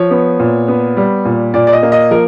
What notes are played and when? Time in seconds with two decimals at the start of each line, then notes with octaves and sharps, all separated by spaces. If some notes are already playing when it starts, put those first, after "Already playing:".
Already playing: F3 C#5
0.11 B3
0.39 A#2
0.68 B3
0.97 G3
1.25 A#2
1.54 A#2 D5
1.67 D5
1.73 D#5
1.83 A#3
1.92 D#5
2.11 F3 A#4